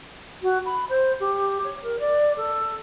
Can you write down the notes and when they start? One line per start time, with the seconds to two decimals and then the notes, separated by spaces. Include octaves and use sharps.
0.42 F#4
0.65 B5
0.89 C5
1.20 G4
1.64 C#5
1.82 A#4
1.99 D5
2.37 A4